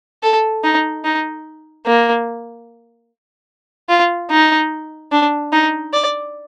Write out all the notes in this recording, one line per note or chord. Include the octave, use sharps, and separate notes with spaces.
A4
D#4
D#4
A#3
F4
D#4
D4
D#4
D5